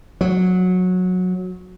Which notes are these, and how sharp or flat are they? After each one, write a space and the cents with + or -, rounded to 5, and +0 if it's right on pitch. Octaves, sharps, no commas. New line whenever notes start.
F#3 -15